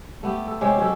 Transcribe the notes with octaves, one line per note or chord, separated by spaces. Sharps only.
A3 B3 G4
A4
C3 G#3 C#4 G4
F#3 C#4 G4 A4